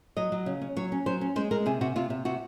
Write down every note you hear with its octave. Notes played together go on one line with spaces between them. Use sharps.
F#3 D#5
F#3
C#3
C#4
F#3 C#5
C#4
F#3 C5
C#4
G#3 C5
G#3 A#4
C3 G#4
C3 F#4
C3 F4
C3
C3 F#4